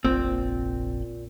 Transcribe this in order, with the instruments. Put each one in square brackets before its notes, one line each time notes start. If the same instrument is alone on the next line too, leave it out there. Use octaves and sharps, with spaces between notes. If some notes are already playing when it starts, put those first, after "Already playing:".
[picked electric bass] F1 A#1 [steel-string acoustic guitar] A#2 [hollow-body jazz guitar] C4